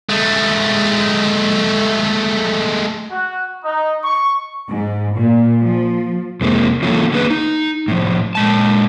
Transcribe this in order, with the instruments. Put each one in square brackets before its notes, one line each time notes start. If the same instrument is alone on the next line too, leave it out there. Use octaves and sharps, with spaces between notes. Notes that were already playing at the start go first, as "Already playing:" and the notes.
[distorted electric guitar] G#3 A3
[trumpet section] F#4
D#4
C#6
[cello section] G#2
A#2
F3
[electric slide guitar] F2 C3 G#3 A#3
E3 F#3 A#3 C#4 F4 A4
A#3 D4 G#4 A#4 B4
D#4
A2 F3
A#2 G#3 A5